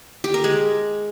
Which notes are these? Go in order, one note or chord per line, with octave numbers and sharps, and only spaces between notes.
G4
A#4
G#3